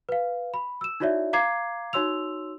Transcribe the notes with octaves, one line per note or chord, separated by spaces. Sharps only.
B4 F5
B5
E6 E7
D#4 E4 F#4 C#5 D5 E5
F5 A#5 D6 G#6 C7
D#4 F#4 C#5 C6 E6 F7